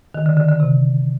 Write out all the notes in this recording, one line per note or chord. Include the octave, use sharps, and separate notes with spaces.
D#3
D3
D3
D3
C3